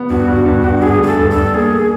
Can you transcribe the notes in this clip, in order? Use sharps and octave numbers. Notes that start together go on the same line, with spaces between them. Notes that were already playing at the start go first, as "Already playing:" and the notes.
Already playing: B3
G2 F#4
G2
G2
G2
G2 G#4
A3 G#4
A4
G2
A4
G2
A#3 G#4